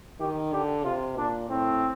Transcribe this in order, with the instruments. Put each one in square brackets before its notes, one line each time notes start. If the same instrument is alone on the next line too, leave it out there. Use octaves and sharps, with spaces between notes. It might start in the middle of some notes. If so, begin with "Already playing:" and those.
[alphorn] D#3 [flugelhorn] G4
[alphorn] D3 [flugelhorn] G4
[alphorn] C3 [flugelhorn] F4
[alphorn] A#2 [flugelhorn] D4
[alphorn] A2 [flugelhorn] C4